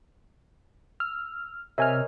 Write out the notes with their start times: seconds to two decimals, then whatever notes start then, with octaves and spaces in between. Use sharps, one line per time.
1.00 E6 F6
1.78 C3 A#4 C#5 D#5 E5 G#5 F6